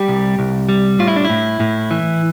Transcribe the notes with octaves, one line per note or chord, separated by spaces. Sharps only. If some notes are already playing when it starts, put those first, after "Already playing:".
Already playing: G3 G4
C2
C2
G3
A2 F4
E4
D4
E4
A2
A2
E3